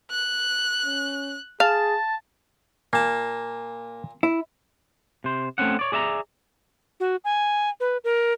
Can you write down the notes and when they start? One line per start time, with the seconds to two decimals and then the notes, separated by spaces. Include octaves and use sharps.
0.11 F#6
0.85 C#4
1.60 G#4 F5 A5
2.93 A#2 A#3 A5
4.23 E4
5.24 C3 C5
5.58 A3 C4 C#4 F#5
5.79 C#5 D5
5.92 G#4 D5 E5 A5 A#5
7.00 F#4
7.24 G#5
7.80 B4
8.04 A#4